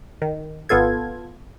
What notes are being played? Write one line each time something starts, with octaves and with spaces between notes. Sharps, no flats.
D#3
G#1 B3 F4 A4 G#6